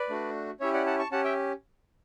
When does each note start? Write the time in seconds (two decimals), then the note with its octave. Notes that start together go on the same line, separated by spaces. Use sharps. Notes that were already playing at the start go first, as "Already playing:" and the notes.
Already playing: B4 D5
0.09 A3 D4 F#4
0.60 C#4 E4 G4 C#5 E5
0.73 D5 F#5
0.86 F#5 A5
0.99 A5 C#6
1.12 C#4 G4 F#5 A5
1.24 E5 G5